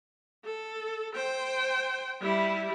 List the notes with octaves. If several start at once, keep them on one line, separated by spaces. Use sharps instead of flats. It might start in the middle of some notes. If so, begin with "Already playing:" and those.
A4
C5 G5
G3 E4